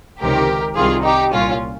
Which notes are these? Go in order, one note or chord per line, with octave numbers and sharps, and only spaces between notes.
C#2 C3 D#3 G4 A#4
C2 C3 D#3 F4 G#4
D#4 G4
C2 A#2 C#4 F4